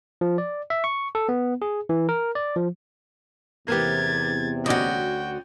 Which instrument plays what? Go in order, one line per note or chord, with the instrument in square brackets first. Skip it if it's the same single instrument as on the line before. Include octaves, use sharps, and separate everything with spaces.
[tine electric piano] F3
D5
E5
C#6
A4
B3
G#4
E3
A#4
D5
F3
[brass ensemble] E2 C3 [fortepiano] A#3 B3 G4 [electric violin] G#6 A6
[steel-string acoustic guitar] D2 F#4 [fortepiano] C#4 D5 D#5 [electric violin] G5